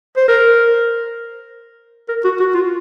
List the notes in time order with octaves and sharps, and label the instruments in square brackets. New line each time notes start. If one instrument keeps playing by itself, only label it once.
[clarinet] C5
A#4
A#4
F#4
F#4
F4